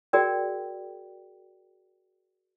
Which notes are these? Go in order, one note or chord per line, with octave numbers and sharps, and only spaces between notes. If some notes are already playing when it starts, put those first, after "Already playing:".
F#4 G#4 A#4 D5 G5